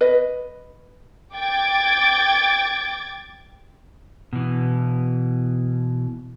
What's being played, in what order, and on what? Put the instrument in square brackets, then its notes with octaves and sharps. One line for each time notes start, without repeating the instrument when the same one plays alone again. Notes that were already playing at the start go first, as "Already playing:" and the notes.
[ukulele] B4 D#5
[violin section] G5 D6 G#6 A6 D7
[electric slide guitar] B2 E3